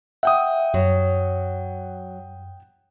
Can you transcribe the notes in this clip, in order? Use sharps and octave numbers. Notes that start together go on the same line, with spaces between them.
E5 F#5 G5 D#6
F#2 F#3